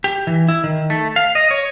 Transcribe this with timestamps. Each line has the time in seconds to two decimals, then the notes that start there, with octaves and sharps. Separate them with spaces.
0.04 G4
0.27 E3
0.48 E4
0.64 D#3
0.90 A3
1.16 F5
1.35 D#5
1.51 C#5